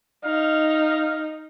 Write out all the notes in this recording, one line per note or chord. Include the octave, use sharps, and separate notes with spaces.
D#4 F5